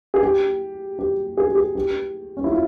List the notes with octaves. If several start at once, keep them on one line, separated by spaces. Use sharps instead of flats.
G#4
G4
G4
G#4
G4
G#4
G4
C#4
E4
F4